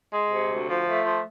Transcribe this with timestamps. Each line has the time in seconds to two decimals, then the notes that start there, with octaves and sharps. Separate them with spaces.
0.11 G#3
0.30 C3
0.49 D2
0.68 F3
0.87 A3
1.05 F3